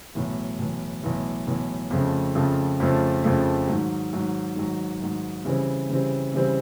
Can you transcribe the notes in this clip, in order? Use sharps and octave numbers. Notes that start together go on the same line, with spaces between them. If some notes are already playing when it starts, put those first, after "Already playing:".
B1 A2 E3
B1 A2 E3
B1 A2 E3
B1 A2 E3
F2 C#3 F3 A3
F2 C#3 F3 A3
F2 C#3 F3 A3
F2 C#3 F3 A3
G#2 D#3 F#3
G#2 D#3 F#3
G#2 D#3 F#3
G#2 D#3 F#3
C#3 E3 G3 C4
C#3 E3 G3 C4
C#3 E3 G3 C4